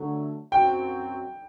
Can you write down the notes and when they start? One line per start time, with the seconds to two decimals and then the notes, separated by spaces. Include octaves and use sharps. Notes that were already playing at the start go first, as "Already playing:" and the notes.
Already playing: D3 F#3 A3
0.52 F#2 F#3 C4 F#4 G5